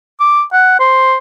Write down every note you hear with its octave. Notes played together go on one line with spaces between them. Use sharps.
D6
F#5
C5